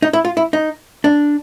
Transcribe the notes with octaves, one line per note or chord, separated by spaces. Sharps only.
D#4
E4
F4
E4
D#4
D4